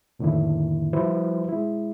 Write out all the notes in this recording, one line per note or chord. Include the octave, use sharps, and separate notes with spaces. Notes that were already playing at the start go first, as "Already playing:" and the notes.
F2 A2 D3 D#3 A#3 E4
F3 G3 E4 F#4 B4 C5
G#3 E4